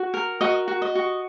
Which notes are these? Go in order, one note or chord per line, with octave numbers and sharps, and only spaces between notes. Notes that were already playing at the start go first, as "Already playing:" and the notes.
Already playing: F#4
A#4
F#4 D#5
F#4
D#5
F#4